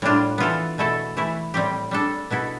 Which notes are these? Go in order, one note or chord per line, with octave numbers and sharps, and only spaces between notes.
A2 G3 D4 F4
E3 B3 F4 A4
B2 A3 E4 A4
E3 A3 E4
A2 G3 C4 G4
G3 D4 A4
B2 B3 E4 A4